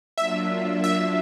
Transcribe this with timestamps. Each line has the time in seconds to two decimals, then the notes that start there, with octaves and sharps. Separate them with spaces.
0.17 F#3 A#3 D4 F4 E5
0.84 E5